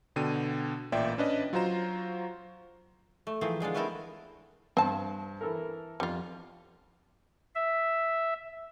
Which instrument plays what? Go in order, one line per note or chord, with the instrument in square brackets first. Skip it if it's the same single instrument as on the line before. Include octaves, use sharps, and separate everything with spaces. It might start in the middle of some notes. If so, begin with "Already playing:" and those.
[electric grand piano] B2 D3 G5 D#7
A1 A#2 D5 E5 G5
C#4 D4 B4 D5 D#5
F#3 F4 F#4 C5 A#5 E7
[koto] A3
E3 F3 A#3 C4 G#4
D3 G#3 D4 F4
A3 B3 C4 E4 A4 A#4
[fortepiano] G2 [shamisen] C4 A5
[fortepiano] E3 A4 A#4
[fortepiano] F2 [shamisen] G3 F4
[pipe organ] E5